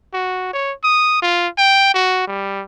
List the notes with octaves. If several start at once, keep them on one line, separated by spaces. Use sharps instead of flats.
F#4
C#5
D#6
F4
G5
F#4
G3